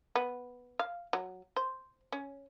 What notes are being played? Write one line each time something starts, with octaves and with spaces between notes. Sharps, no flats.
B3
F5
F#3
C5
C#4